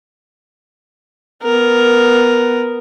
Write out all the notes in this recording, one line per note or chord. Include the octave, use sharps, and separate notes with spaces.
B3 A#4